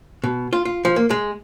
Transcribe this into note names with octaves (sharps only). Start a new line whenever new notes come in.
B2
F4
F4
F3
A#3
G#3